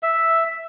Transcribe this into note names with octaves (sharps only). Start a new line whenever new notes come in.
E5